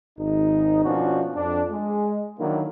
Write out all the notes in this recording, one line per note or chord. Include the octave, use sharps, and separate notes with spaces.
G#1 D#4
B2 F3 A#3 C#4 D4 F#4
F2 D4
G#3
D3 D#3 F#3 A#3 D4 E4